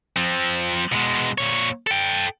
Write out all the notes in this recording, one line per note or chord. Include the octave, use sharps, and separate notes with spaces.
F3 C4
B2 G#3
A#2 C#5
A4 G5